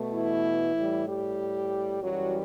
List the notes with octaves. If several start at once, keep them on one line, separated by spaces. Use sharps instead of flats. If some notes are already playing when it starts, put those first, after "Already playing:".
Already playing: B2 A3
E3 E4
A2 G3
G3 G4
F#2 E3 F#3 G3 F#4